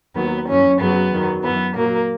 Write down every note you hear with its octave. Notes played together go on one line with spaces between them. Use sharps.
D#2 D#3 F#3 B3
F#2 E3 C#4
F#2 C#3 F#3 B3
E2 D#3 F#3
F#2 E3 B3
A#2 F#3 A#3